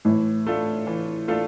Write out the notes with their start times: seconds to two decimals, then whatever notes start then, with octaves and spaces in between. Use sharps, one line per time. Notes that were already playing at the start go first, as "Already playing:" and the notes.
0.05 A2 E3
0.47 A3 D4 F4 A4
0.87 E3
1.28 A3 D4 F4 A4